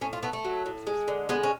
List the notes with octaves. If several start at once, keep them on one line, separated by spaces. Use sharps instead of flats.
A2 C#4
F4
A3 B3
A3
F#3
A2
G#3
D3
G#3 B3
C#4